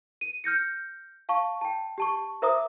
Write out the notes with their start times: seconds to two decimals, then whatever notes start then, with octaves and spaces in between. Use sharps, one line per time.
0.21 D#7
0.44 F6 G6 A#6 C#7
1.29 F5 A5 C#6
1.61 G5 A5
1.98 G4 A5 C#6
2.42 A#4 C5 E5 A#5 D6 D#6